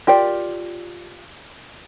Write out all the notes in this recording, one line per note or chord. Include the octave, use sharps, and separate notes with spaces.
F4 G4 A#4 D5